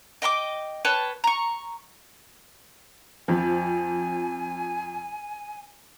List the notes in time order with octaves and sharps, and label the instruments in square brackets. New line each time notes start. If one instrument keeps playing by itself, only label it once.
[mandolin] D#5 G5 B5 D6
B4 C#5 G5 A5
A#5 C#6
[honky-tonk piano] F2 F3 [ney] G#5